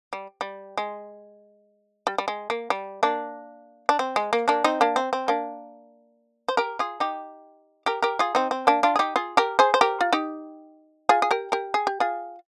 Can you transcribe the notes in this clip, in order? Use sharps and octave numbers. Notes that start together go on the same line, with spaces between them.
G3
G3
G#3
G3
G3
G#3
A#3
G3
A#3 D4
D4
C4
G#3
A#3
A#3 D4
C4 D#4
A#3 D4
C4
C4
A#3 D4
C5
G4 A#4
F4 G#4
D#4 G4
G4 A#4
G4 A#4
F4 G#4
C4 D#4
C4
A#3 D4
D4 F4
G#4
D#4 G4
F4 G#4
G4 A#4
G#4 C5
C5
G4 A#4
F4
D#4 G4
F4 G#4
G#4
G4 A#4
G4 A#4
G#4
G4
F4 G#4